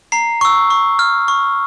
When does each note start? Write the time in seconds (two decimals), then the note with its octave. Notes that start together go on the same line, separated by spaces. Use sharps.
0.12 A#5 C7
0.41 C#6 E6
0.70 C#6
0.99 F6
1.28 C#6